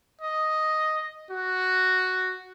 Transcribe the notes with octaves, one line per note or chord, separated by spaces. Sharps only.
D#5
F#4